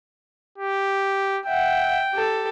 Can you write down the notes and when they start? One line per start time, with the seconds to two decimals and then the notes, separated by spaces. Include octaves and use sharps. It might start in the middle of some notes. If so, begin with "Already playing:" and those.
0.58 G4
1.46 E5 F#5 G5
2.13 G4 A4